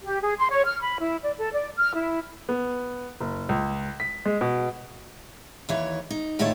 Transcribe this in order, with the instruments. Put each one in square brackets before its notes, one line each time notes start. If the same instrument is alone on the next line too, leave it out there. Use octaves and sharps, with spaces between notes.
[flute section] G4
G#4
C6
C#5
F6
B5
E4
D5
A4
D5
F6
E4
[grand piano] B3
F#1
C#2
B6
G#3
B2
[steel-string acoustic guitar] D#2 E3 C#5
D#4
D2 A2 D#3 F4 A4 C#5